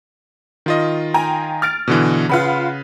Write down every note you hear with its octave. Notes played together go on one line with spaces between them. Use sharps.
D#3 F4 D#5
G5 G#5 A#5
F6 A6 D7
B2 D3 E3
C#3 F4 B4 F#5 B5